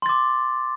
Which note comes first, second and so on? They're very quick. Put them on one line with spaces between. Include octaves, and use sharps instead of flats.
C6 A6 D6